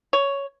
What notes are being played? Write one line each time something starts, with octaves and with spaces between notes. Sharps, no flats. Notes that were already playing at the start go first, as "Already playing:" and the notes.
C#5